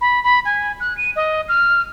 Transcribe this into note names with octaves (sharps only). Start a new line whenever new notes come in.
B5
B5
G#5
F#6
D#7
D#5
F6